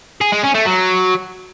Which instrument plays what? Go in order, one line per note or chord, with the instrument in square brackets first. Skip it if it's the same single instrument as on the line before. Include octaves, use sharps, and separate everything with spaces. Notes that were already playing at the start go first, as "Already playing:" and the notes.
[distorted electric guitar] G#4
G#3
C#4
A3
F#3